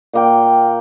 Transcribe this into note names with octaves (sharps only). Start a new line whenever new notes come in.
A#2 A#3 G5